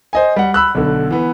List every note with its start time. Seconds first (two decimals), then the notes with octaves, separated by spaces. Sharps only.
0.13 C5 D#5 G#5
0.36 G3 F#5
0.54 B5 E6 F#6
0.75 B1 D3
1.11 E3 B3